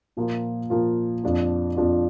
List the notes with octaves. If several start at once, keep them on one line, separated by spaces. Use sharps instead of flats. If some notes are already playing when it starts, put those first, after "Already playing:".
A#2 F3 A#3 F4
A#2 F3 A#3 F4
F2 F3 D4 F4
F2 F3 D4 F4